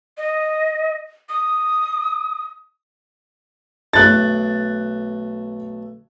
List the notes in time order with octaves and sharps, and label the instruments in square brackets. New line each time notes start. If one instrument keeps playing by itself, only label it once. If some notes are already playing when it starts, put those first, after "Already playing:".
[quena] D#5
D#6
[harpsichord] B1 A3 [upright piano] F#6 A6